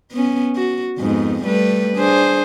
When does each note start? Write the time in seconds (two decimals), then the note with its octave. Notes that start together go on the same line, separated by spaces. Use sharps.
0.12 B3 C#4
0.56 F#4
0.98 F2 G#2 B3
1.44 G3 A3 B4
1.96 D4 G#4 C5